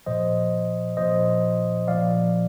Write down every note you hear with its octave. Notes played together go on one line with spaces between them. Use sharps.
A#2 F3 C5 D#5
A#2 F3 C5 D#5
A#2 F3 D5 F5